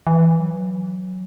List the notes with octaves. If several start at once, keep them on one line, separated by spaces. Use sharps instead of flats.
E3
F#3